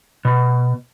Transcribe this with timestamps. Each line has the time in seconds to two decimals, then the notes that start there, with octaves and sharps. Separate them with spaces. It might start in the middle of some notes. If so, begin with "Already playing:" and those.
0.25 B2